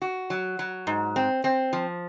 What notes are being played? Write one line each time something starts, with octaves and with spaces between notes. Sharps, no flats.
F#4
F#3
F#3
G#2
C4
C4
F3